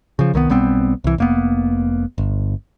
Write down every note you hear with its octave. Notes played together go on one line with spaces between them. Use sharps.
C#3 F3
C2 D#3 G3 B3
B1 G3 B3 C4
C2 E3
F1 A#3 B3
G1